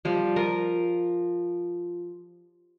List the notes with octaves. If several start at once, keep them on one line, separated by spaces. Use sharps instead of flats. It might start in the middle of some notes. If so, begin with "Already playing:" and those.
F3 G3
F4 A#4